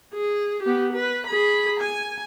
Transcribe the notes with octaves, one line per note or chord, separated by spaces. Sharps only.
G#4
B3 G4
B4
G#4 B5
G#5